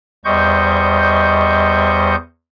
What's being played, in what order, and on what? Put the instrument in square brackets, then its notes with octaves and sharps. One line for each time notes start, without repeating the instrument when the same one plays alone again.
[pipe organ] E2 G3 C5 D#5 C#6 G6